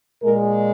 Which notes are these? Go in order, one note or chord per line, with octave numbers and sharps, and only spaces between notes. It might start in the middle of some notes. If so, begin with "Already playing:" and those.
A#2 G#3 A#4